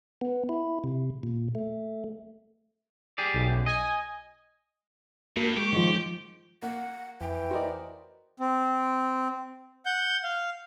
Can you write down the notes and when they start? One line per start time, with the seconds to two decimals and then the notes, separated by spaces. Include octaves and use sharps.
0.21 B3
0.49 E4
0.84 C3
1.23 A#2
1.55 A3
3.18 G4 G#4 D5
3.34 B1
3.49 F#2
3.66 D#5 G#5
5.36 G2 A#3 F#4 A#4
5.57 G#3 G4 C#6
5.72 D#3 F3
6.62 A#3 F#5
7.21 F2 E3 G5
7.51 F#4 A#4 C5 D5 D#5
8.40 C4
9.86 F#5 G6
10.23 F5